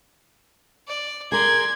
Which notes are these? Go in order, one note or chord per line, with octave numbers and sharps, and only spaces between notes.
D5
G#4 A#4 D5 C6 G#6